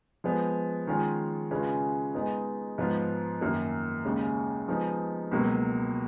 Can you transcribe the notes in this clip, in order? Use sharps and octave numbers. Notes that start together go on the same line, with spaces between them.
F3 G#3 B3
D#3 G#3 C#4 F4
C#3 G#3 C#4 F4 B4
G#3 B3 D#4
G#2 F3 B3 F4
F#2 D#3 A#3
D#2 C#3 G#3 C#4
F3 G#3 B3 D#4
C#2 B2 F#3 A#3